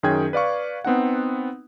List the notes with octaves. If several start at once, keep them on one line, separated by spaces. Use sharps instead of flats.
F#2 D#3 C#4 G#4 G5 G#6
B4 D5 F5 C#6
B3 C4 D#4 F#5